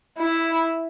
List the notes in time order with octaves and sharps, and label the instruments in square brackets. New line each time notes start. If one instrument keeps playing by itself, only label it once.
[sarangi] E4